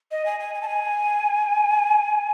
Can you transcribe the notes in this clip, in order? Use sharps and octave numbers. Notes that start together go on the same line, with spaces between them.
D#5
G#5
G#5
G#5
A5
G#5